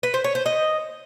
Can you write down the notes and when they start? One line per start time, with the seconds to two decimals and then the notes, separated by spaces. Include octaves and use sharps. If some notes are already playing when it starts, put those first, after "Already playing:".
0.03 B4
0.14 C5
0.24 C#5
0.35 C5
0.46 D#5